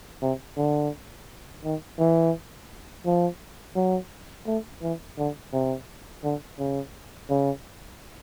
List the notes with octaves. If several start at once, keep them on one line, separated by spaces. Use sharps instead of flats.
C3
D3
D#3
E3
F3
F#3
A3
E3
D3
C3
D3
C#3
C#3